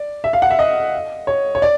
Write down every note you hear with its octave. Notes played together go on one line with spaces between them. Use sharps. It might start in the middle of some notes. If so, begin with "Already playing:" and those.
Already playing: D5
E5
F5
F#5
E5
D#5
C#5
C#5
D5